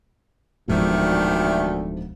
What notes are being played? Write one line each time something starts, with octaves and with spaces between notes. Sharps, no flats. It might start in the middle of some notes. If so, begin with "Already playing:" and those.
D1 D2 G#2 B2 D#3 F3 G3 A3